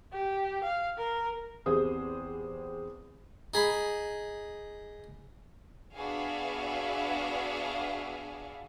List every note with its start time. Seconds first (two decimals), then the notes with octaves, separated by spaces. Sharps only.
0.12 G4
0.64 F5
0.98 A#4
1.66 E2 C4 G4 G#4 C5 D#6
3.54 D#4 G#4 B5
5.94 B3 D4 F#4 G#4 E5 F5